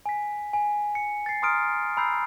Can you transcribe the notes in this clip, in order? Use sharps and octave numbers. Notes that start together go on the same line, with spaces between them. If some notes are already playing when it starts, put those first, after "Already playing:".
G#5 B6
G#5
C#7
A6 C7
A#5 C6 D#6 F6 D7
A#5 B5 E6 G6 C7